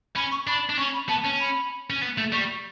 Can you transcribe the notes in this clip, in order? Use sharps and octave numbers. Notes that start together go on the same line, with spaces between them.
C#4 B5
C#6
D4 B5
D4
C#4 C#6
B5
B3 A5
C#4
B5
C#4
B3
A3
G3 C#6